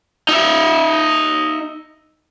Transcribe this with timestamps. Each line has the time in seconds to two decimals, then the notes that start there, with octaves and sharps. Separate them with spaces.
0.29 D#4 E5